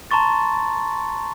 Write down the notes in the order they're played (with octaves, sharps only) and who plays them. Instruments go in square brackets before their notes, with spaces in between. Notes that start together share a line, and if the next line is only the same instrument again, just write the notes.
[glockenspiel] A5 A#5 C6 C#6 A6